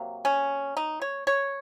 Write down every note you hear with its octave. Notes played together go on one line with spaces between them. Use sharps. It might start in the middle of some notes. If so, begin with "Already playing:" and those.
Already playing: C3 F#3 A#3
C#4
D#4
C#5
C#5